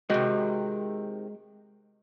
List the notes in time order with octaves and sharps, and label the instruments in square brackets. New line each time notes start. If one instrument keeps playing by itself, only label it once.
[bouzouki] C3 D#3 [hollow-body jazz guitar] G#3 F#4 G5